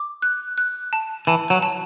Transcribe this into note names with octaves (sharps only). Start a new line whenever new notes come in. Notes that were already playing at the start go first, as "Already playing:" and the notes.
Already playing: D6
F#6
F#6
A5
E3 A5
F#3
A5